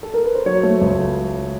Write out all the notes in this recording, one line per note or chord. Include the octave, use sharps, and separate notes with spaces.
A4
A#4
B4
C5
F#3 C#5
A3
C#2